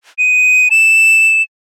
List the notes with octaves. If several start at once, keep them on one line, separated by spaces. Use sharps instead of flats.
D#7
E7